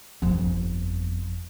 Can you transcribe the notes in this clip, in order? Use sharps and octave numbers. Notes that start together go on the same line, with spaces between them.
G1 F2